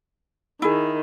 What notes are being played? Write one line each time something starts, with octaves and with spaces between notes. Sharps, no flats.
D#3 E4 G#4